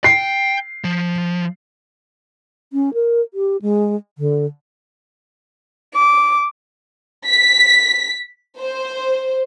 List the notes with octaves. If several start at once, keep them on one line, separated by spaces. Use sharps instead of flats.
G5 C7
F3
C#4
A#4
G4
G#3
D3
D6
B6
C5